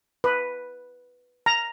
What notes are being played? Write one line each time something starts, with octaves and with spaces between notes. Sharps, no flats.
B4
A#5